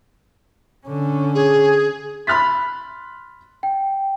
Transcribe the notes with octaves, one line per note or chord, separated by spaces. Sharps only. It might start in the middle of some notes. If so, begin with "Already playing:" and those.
D3 C#4
G#4
B5 C6 F6 F#6 A6 B6
G5